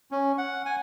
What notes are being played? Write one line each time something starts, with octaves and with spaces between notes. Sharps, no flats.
C#4
F#5
G#5